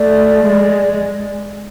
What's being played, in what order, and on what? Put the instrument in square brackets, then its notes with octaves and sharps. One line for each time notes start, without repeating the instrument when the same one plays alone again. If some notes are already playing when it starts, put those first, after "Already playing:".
Already playing: [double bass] A3 [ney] D5
[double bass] G#3